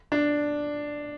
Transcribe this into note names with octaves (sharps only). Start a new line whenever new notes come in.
D4